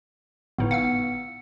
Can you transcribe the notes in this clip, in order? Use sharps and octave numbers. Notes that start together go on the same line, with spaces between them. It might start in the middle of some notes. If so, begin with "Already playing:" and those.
G1 A2 B3 D#4
F5 F#5 E6 C#7